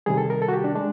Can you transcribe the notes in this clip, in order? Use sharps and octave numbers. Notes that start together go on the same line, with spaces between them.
C3 D#3 G3 G#4
A4
A#4
A4
F#4
G4
D4
G#3 D4